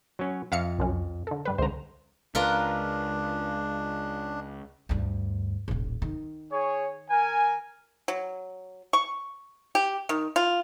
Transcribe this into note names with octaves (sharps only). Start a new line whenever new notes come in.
F#3 C#4
F2 E5 F5 C#7
C2 F#2 C#4
D3 A4
G2 G3 B4
C#2 D3 C5 A#5
C#2 D4 F4 A#4 B4
D2 G2
D#1 A1
D#3
G#4 C#5
A#4 G#5
F#3
C#6
G4
D#3
F4